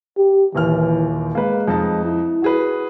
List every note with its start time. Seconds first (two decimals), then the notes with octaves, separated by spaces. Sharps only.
0.17 G4
0.55 D#1 D#2 E3 F6
1.35 G#3 A#3 B4
1.68 F2 D#4 A5
2.05 E4
2.42 F#4 G#4 B4